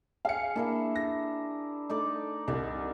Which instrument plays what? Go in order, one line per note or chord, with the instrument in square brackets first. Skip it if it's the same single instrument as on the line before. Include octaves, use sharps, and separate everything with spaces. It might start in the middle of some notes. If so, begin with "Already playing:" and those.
[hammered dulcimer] G#4 [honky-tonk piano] F5 C#7
[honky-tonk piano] A#3 [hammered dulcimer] D4 E4 A#4
[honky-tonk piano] A#6
[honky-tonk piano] A3 [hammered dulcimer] D#4 D5 D6
[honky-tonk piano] C2 [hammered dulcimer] D#4 D5